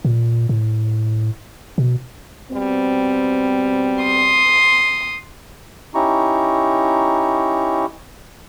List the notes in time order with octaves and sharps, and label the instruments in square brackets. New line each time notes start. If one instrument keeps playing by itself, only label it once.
[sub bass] A#2
A2
B2
[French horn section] B2 G3 C4
[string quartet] C6 D#6
[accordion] C#4 D#4 E4 G4 A#5 C#6